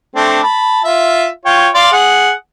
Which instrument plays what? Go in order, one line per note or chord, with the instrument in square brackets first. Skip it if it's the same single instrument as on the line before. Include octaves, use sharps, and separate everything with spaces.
[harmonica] A3 C4 D4
A5 B5
F4 E5
F4 C#5 G5
D5 F5 C6
G#4 F#5